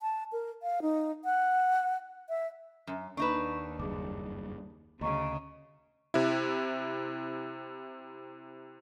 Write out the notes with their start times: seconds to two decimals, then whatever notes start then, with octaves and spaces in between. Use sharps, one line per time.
0.01 A5
0.32 A#4
0.62 F5
0.82 D#4
1.25 F#5
2.29 E5
2.87 F#2
3.17 D#2 D4 D#4 B4 C#6 E7
3.79 F#1 G2 G#4 D6
5.01 D2 C#3 D#5 A#5 C#6
6.14 C3 E4